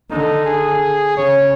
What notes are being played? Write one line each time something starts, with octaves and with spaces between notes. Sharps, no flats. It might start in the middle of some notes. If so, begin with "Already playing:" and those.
D3 D#4
G#4
C#3 C#5